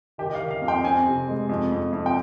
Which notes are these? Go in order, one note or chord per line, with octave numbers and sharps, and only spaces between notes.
D#3 G4
D#5
F5
D#3
F5
F2
G5
C4 G#5
C3
G#3
F2
F2
F2
G5